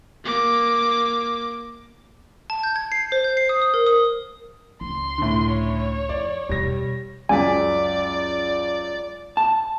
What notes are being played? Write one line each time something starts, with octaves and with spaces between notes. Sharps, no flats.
A#3 D6
A5
G6
G#6
C7
C5
G6
C7
D#6
D#6
A#4
D#6
C#2 C6
A2 D3
C#5
F2 D5
E2 B2 G3 A#6
C#2 F#2 D5 G#5 B6
A5